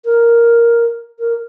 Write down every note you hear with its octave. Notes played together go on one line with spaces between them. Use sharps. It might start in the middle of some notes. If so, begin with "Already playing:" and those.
A#4
A#4